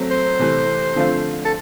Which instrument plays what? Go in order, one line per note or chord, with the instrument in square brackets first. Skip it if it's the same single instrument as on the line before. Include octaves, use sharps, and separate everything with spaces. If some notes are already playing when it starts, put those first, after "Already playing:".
Already playing: [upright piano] F#3 A3 C4
[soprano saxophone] C5
[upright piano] C3 E3 A3
D3 F3 A3 C4 F4
[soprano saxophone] A4